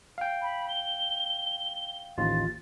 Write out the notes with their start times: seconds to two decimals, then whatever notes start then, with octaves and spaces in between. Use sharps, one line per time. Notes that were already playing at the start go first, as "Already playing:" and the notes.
0.18 F5 G5
0.42 B5
0.69 G7
2.18 A1 D#2 F4 A6